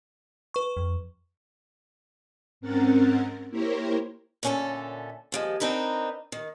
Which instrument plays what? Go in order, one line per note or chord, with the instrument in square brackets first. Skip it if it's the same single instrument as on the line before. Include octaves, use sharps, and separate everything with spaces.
[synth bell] B4 C#6
[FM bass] F2
[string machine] G#2 C4 C#4 A#4 F#5 A6
A#3 E4 G4 A#4 C5 C#5
[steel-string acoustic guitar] A#2 D3 C#4 G4 A4 E5
D#2 F3 G#3
C4 D4 D#4 A#4 B4
D#3